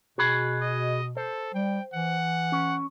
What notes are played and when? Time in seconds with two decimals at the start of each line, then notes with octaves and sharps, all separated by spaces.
0.18 B2 F#4 G#4 B5
0.61 D#5
1.17 A4 C5
1.54 G3 G5
1.94 E3 F#5
2.52 C#4